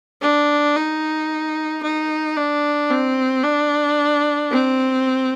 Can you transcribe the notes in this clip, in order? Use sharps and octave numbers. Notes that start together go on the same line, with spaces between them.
D4
D#4
D#4
D4
C4
D4
C4